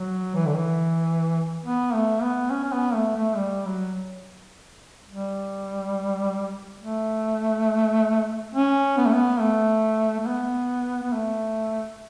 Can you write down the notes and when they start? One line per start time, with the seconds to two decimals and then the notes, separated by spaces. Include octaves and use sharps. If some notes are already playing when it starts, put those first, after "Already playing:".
Already playing: F#3
0.35 E3
0.46 D3
0.55 E3
1.65 B3
1.94 A3
2.23 B3
2.51 C#4
2.64 C#4
2.72 B3
2.94 A3
3.16 A3
3.37 G3
3.66 F#3
5.10 G3
6.82 A3
8.54 C#4
8.98 B3
9.06 A3
9.14 B3
9.40 A3
10.20 A3
10.27 B3
11.03 B3
11.13 A3